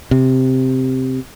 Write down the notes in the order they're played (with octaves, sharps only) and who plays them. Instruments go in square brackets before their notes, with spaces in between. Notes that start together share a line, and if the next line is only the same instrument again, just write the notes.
[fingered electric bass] C3